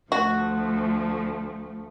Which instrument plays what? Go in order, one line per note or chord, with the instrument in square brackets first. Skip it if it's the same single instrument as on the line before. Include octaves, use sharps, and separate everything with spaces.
[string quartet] D2 F3 A3 [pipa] F#4